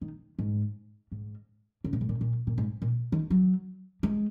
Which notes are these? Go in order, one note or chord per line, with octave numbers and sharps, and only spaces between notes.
D#3
G#2
G#2
C#3
A#2
G#2
A#2
A#2
A#2
G#2
A#2
D#3
F#3
G#3